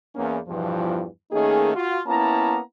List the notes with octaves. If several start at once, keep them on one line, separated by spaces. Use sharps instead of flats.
E2 A#3 C#4
E2 G2 B2 E3 F3
D#3 A3 A#3 C#4 D#4 G#4
F4 F#4
A#3 B3 C#4 E4 A5 A#5